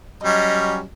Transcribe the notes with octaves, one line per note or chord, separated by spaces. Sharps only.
F#3 G3 C#4 D#5